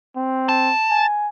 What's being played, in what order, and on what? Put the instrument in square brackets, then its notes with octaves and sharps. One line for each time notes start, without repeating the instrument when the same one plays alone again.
[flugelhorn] C4
[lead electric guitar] A5
[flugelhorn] G#5